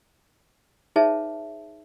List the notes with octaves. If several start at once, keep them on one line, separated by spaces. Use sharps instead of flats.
D#4 G#4 B4 C#5 E5 A5